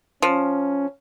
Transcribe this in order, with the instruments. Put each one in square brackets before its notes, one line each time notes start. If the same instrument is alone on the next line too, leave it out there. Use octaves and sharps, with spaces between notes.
[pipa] F3 [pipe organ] C#4